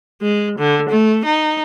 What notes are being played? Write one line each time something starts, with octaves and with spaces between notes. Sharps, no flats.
G#3
D3
A3
D#4